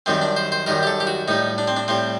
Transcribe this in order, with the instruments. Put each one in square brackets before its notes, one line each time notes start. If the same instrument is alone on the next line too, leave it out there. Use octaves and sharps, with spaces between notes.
[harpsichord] F#2 D#3 G3 C4
D4
C5
C5
F#2 D#3 G3 A#4
G4
A4
G4
F#4
A2 G3 D#4
D4
C4
D4
A2 G3 C4